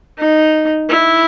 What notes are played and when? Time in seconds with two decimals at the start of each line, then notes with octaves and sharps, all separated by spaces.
0.18 D#4
0.89 E4